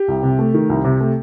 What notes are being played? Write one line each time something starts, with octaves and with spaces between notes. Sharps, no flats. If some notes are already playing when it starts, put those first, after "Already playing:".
Already playing: G4
C2
C3
A3
D#3
C2
C3
A3